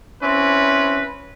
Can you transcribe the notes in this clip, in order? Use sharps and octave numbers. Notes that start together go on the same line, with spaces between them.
C4 C#4 E4 B4